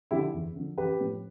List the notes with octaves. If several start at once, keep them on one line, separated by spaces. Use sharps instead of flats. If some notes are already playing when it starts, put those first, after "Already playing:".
D3 F3 E4 G4
E2
D3 F3
A1 G4 B4
A2 F3